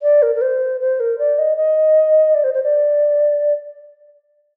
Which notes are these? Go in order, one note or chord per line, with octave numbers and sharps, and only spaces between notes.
D5
A#4
A#4
C5
C5
A#4
D5
D#5
D#5
D5
C5
C5
D5